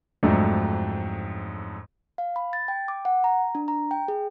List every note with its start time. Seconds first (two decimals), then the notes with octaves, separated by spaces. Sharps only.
0.23 F2 G#2 F#3 A3 D4 D#4
2.18 F5
2.36 B5
2.53 A6
2.68 G5
2.88 D6
3.05 F#5
3.24 A#5
3.55 D4
3.68 A#5
3.91 G5
4.08 G#4